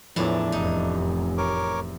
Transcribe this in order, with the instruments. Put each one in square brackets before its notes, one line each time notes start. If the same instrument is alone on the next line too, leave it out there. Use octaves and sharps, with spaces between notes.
[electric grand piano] E2 E3 F3 [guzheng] A2 E4 [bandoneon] D4
[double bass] F1 [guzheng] D#4
[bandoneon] A#4 C#5 D6